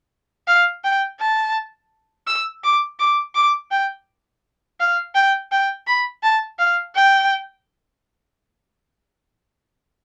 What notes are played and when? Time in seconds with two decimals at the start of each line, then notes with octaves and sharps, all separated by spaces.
0.48 F5
0.84 G5
1.20 A5
2.27 E6
2.64 D6
2.99 D6
3.35 D6
3.71 G5
4.80 F5
5.15 G5
5.52 G5
5.87 B5
6.23 A5
6.59 F5
6.95 G5